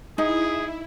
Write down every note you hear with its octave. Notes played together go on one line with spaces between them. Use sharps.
D#4 E4 G#4